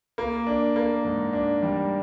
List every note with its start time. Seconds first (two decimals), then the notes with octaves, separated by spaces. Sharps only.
0.18 A#3
0.47 D4
0.76 A#3
1.05 G#2
1.33 D4
1.63 G3